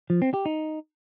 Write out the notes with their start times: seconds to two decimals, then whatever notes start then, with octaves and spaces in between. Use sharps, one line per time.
0.10 F3
0.22 C4
0.34 G4
0.46 D#4